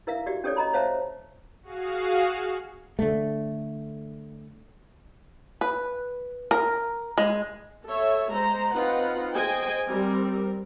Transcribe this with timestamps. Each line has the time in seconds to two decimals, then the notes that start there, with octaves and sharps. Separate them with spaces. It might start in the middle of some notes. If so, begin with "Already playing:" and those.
0.07 E4 A#4 E5 F5
0.26 F#4 G4 D5
0.44 C#4 G4 A4 C#5 D5
0.56 D#5 A#5 B5
0.73 C5 C#5 E5 F5 A5 A#5
1.63 F#4 G#4 F5
2.99 D3 A3
5.61 B4
6.51 A#4
7.18 G#3
7.86 A4 C#5 E5
8.31 G#3 C5 A#5
8.74 C4 D#4 F4 B4 F#5
9.35 G#4 C5 D#5 G5 G#5
9.87 G3 C4 A#4